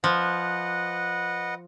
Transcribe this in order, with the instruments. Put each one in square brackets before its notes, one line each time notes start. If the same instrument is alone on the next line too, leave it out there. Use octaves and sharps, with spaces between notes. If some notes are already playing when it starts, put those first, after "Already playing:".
[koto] F3 [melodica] B4 D#5 F#5